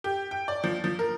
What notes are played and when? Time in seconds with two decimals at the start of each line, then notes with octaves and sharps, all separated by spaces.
0.04 G4
0.31 G5
0.48 D5
0.64 F3
0.84 F3
0.99 A#4